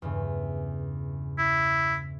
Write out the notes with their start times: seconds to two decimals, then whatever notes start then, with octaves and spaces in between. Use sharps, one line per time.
0.02 E2 G2 C#3
1.38 E4